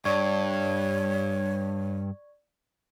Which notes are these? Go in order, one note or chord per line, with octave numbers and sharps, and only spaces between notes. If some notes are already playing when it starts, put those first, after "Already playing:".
G2 C#5 D5 C#6 G#6